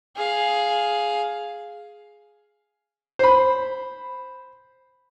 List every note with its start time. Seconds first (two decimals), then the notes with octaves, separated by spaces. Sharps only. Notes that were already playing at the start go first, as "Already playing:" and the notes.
0.16 G#4 F5
3.19 C5 B5